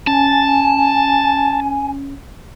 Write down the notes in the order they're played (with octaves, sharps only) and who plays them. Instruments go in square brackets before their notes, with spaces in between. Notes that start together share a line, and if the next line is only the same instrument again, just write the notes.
[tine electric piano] C#4 [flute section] G#5 [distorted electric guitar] A5